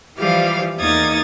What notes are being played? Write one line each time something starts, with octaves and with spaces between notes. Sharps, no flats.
E3 F3 G3 F5 F6
E2 A#3 D#4 D#6 G#6 A6